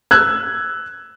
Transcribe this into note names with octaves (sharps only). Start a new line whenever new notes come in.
E6 F#6 G#6